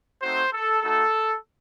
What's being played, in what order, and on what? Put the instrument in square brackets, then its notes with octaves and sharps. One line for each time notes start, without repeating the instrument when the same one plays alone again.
[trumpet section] A3 C4 D#4 F#4 C5
A4
A3 D#4 F#4 A4